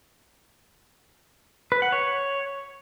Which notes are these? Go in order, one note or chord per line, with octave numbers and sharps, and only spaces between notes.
B4
F#5
C#5